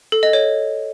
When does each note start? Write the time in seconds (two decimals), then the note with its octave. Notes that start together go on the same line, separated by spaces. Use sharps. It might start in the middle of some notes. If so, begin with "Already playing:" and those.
0.12 A4
0.23 D#5
0.33 C#5